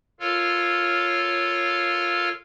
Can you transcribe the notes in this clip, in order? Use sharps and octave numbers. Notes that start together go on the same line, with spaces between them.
F4 A4 A#4 C#5 F5 F6